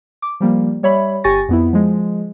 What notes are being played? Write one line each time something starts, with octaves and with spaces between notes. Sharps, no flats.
D6
F3 G3 A#3
G3 C#5 E5 B5
G1 G4 G#5 C#6 A6 A#6
F2 B3 E4
F3 G#3